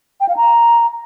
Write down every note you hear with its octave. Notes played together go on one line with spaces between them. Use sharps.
G5
F5
A#5